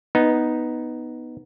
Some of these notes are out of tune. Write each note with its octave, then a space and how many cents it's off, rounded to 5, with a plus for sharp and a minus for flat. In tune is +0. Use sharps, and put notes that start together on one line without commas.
B3 +0 D#4 +0